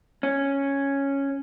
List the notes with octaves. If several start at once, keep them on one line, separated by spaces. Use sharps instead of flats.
C#4